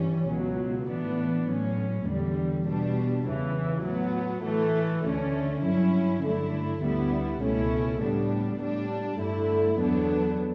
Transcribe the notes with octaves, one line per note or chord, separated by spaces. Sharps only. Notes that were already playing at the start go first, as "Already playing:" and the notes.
Already playing: G2 E3 G3 C#4
C#2 B2 F#3
A2 E3 B3 D4
A2 F#3 C#4
E2 D3 G3
B2 G3 D4
E2 C#3 E3
A2 F#3 B3
A2 E3 A3
D2 D3 A3 C#4
G2 F#3 C#4 E4
G2 D3 A3 E4
D2 D3 G3 B3 E4
C#2 B2 A3 C#4 E4
A2 G3 B3 D4
A2 G3 D4
G2 D3 A3 E4
E2 D3 F#3 B3 D4